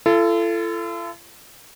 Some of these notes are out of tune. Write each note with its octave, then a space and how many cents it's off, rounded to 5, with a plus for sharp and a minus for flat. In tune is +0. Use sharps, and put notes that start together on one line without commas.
F4 -45 A4 +0